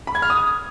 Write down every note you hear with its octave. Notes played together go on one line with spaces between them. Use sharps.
B5
G#6
F6
D#6